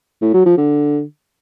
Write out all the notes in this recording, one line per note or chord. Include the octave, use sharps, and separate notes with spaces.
A2
F#3
F3
D3